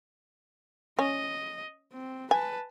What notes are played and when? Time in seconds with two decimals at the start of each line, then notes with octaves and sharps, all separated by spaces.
0.99 C#4 D#5
1.93 C4
2.31 B4 G#5 A5